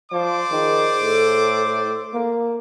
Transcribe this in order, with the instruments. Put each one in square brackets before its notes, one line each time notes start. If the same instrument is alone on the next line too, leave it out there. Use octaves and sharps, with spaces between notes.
[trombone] F3 [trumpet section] C5 D5 D6
[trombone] D#3 [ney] G#4
[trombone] A2 [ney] A4
[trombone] A#3